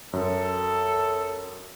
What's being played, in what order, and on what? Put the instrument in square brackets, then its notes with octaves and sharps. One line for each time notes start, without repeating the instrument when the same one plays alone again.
[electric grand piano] F#2 [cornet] A4